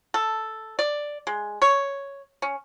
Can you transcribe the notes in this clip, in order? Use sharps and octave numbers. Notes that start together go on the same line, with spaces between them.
A4
D5
G#3
C#5
C#4